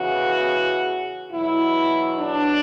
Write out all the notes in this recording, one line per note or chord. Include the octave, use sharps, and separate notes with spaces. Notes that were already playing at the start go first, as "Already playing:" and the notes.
Already playing: E2 C#3 E3 F#4
E2 B2 F#3 E4
D4